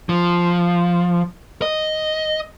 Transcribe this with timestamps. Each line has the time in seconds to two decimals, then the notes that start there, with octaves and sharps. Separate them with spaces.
0.09 F3
1.62 D#5